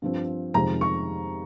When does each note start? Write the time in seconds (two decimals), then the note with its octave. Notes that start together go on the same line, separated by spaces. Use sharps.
0.02 G2 F3 C4
0.54 F2 C3 D#3 G#3 A#5
0.81 C#6